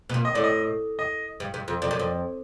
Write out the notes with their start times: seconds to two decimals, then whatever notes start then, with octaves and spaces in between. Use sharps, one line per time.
0.09 B2
0.14 A#2
0.25 D#5
0.34 A2 D5
0.44 D#5
0.99 D#5
1.40 G2
1.54 G2
1.68 F2
1.82 F2 D5
1.91 F#2
1.99 F2